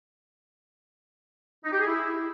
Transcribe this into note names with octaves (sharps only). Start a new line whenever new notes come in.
D#4
G4
G#4
E4